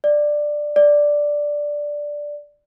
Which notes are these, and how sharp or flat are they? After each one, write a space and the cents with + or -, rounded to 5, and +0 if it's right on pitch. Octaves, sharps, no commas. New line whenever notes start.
D5 +10
D5 +0